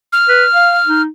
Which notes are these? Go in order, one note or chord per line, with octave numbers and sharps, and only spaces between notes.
F6
B4
F5
D#4